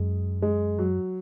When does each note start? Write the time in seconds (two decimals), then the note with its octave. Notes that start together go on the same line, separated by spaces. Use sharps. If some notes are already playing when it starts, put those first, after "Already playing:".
Already playing: F#2 G#3
0.42 G#3
0.79 F#3